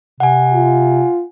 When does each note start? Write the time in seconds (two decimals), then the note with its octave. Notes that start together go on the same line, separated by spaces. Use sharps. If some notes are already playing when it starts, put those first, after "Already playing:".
0.20 C3 F#5 G#5
0.53 F4